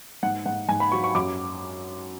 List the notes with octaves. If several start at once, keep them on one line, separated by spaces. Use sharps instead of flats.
G#2 F#5
G#2 F#5
G#2 G#5
B5
F#3 C#6
C#6
F#2 D6